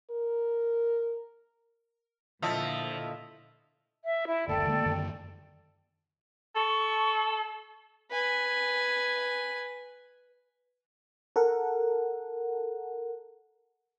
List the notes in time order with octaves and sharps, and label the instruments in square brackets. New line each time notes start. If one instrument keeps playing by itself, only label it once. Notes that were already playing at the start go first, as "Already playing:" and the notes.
[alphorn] A#4
[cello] A#2 D3 [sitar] F3 [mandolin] A3 E5 [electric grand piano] E4 D#5 A5
[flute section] E5
E4
[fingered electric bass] F#1 D2 [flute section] A4 D5 G5
[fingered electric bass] D3 G#3 A#3
F#2 D3 D#3
[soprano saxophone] A4 [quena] C#6
[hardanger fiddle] B4 G#5
[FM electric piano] A4 A#4 F#5